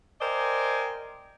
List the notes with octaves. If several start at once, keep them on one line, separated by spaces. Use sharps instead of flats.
A#4 C5 D5 D#5 G5 G#5